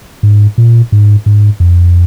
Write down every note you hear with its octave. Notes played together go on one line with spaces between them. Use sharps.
G#2
A#2
G#2
G#2
F2